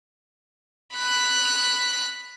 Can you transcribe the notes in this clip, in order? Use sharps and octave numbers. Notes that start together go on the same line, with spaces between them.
B5 F#6